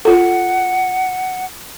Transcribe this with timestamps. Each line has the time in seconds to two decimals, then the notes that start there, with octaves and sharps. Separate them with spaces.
0.05 F4 A4 F#5